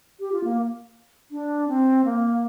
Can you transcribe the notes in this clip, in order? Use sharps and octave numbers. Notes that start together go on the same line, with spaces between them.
G4
F4
A#3
D4
C4
A#3